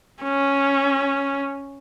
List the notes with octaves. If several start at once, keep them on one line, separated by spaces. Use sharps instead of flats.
C#4